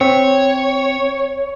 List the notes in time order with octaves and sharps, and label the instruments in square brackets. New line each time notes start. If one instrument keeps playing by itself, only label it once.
[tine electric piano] C4 [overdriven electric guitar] C#5